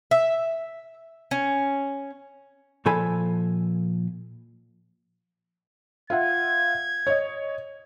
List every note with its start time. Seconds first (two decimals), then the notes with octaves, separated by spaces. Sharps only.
0.11 E5
1.31 C#4
2.86 A#2 F3 A4 G#5 B5
6.10 F4 E5 F#5 G#6
7.07 C#5 D#5